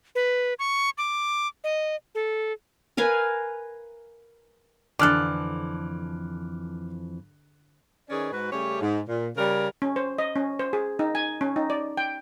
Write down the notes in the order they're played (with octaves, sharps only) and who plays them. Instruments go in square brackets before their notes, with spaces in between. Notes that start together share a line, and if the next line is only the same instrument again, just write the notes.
[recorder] B4
C#6
D6
D#5
A4
[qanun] A#4 B4 F5 G#5
[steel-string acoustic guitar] F2 E3 F3 [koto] D3 A4 [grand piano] D6 F6 F#6
[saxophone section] D#3 C#4 G#4 B4 C#5 D5
G#2 F#4 B4
C#3 G3 A3 C#4 G4 C#5
G#2
A#2
C#3 G3 A#4
[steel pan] C#4
C5
D#5
C#4
C5
G#4
D#4
G#5
C#4
D#4
D5
G5